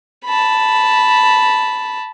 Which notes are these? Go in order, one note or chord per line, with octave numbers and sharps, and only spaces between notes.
A5 B5